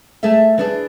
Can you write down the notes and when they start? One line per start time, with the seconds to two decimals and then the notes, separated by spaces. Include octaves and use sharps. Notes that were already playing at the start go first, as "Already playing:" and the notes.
0.23 A3 G#4 A4 E5
0.58 E3 D4 G#4